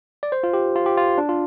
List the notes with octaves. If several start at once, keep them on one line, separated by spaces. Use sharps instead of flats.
D5
C5
F4
G4
F4
G4
F4
D4
F4